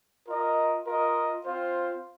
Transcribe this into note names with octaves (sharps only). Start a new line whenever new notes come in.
F4 A#4 D#5
F4 A#4 D#5
C4 F4 C5